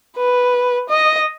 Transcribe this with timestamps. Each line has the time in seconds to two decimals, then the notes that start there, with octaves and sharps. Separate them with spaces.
0.17 B4
0.89 D#5